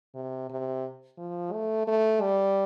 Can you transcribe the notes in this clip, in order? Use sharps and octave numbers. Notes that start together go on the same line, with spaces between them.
C3
C3
F3
A3
A3
G3